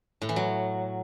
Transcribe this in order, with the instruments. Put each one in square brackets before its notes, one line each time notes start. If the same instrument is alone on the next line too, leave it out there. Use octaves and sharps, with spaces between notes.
[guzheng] A2
E3
F#3